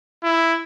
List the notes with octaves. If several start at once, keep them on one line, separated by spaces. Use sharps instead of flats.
E4